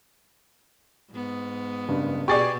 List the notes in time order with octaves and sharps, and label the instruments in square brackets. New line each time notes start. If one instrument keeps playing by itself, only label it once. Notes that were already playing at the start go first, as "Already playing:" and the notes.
[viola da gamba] G#2 B3
[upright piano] F#1 G2
[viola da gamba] B2 B3 [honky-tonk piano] G4 G#4 D5 [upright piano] C#6 A6